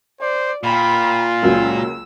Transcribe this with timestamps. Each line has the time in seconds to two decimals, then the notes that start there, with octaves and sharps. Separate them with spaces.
0.21 C5 D5
0.64 A#2 F4 G5 B5
1.43 C#2 F#3 A#3 E6